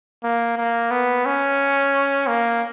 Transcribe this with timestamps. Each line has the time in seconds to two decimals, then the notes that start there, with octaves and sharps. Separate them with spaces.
0.24 A#3
0.57 A#3
0.91 B3
1.26 C#4
2.27 A#3